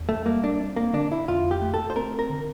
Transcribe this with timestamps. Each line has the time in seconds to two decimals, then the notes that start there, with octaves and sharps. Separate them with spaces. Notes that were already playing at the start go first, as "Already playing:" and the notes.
Already playing: E2
0.09 A3
0.26 G3 A#3
0.44 D4
0.60 C4
0.76 A#3
0.93 D3 D4
1.12 E4
1.28 F2 F4
1.51 G4
1.62 A3
1.74 A4
1.90 C5
1.96 C4 A#4
2.19 A#4
2.30 D3